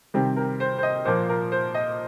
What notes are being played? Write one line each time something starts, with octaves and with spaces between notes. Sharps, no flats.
C3 D#3 G3 C4 G4
A#4
C5
C5
D#5
A#2 F3 A#3 C5
A#4
C5
D#5